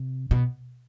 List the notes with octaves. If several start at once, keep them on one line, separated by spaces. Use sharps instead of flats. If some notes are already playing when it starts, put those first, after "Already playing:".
Already playing: C3
B2